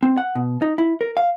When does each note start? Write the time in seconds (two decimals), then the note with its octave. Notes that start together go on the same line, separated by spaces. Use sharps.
0.03 C4
0.18 F#5
0.35 B2
0.62 D#4
0.78 E4
1.01 A#4
1.17 F5